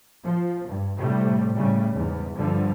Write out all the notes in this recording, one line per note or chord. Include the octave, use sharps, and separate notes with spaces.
F3
G2
A2 C3 G3 A3
A2 C#3 G3
E2 G#2
G2 D3 F3 G3